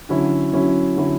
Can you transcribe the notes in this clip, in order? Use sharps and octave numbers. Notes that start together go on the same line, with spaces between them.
D3 F#3 C#4 E4
D3 F#3 C#4 E4
D3 F#3 C#4 E4